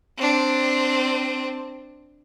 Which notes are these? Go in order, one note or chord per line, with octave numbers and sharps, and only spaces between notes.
C4 D4